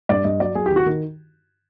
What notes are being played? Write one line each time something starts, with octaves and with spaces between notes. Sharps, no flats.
G2 D5
G2 D#5
F#3 D5
F#3 G#4
G4
D#3
F#4
D#3